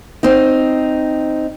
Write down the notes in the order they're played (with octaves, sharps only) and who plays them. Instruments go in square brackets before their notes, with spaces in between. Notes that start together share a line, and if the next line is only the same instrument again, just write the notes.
[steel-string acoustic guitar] C4 D#4